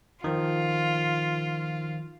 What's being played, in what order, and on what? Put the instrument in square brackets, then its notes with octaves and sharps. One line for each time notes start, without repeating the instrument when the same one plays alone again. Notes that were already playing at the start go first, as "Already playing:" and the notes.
[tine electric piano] D#3 F3 [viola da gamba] F4